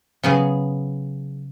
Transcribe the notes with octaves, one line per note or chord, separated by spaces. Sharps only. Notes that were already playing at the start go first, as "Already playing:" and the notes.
C#3 F#3 B3 G#4